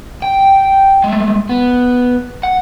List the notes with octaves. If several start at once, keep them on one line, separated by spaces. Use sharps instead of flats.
G5
G#3 A3
B3
F#5